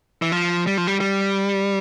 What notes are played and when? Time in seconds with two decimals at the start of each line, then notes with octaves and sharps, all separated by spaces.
0.22 E3
0.32 F3
0.67 G3
0.77 F3
0.87 G3
1.00 G3